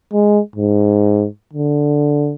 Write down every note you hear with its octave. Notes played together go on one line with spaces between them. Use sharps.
G#3
G#2
D3